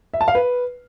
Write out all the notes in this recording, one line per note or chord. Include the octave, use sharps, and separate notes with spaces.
E5
A5
F5
B4